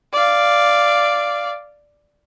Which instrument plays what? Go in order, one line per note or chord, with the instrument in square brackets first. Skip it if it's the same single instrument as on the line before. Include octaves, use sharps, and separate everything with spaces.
[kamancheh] D5 F5